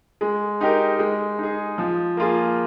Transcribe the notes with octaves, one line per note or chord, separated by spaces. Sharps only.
G#3
D#4 G4 A#4
G#3
D#4 G#4
F3
A#3 F4 G#4